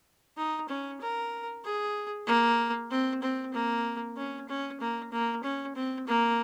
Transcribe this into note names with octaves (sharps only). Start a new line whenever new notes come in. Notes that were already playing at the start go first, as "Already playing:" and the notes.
D#4
C#4
A#4
G#4
A#3
C4
C4
A#3
C#4
C#4
A#3
A#3
C#4
C4
A#3